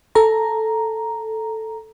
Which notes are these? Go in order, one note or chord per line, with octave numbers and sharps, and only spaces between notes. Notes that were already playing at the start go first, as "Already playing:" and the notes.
A4 A#5